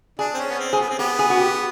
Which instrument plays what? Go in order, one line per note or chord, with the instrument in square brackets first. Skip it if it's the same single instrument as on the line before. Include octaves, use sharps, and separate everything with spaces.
[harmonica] D4 [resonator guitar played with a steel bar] G#4
[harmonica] C4
C#4
B3
C4
[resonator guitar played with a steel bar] G#4
[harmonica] B3
C4
[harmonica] B3 [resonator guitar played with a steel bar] G4
[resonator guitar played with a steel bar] G#4
F#4
G4